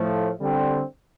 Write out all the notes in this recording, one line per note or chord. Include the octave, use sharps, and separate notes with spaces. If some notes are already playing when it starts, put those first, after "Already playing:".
Already playing: A2 F3 A3
D3 G3 C4